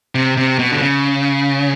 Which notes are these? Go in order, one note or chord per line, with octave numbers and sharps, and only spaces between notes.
C3
C3
B2
D3
C#3